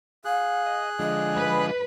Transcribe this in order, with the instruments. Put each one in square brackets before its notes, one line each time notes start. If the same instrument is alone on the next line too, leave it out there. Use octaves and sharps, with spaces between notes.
[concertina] G#4 F#6 [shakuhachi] F5
[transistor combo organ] D#5
[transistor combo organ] D3 F3 G#3 [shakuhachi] D#5
[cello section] B4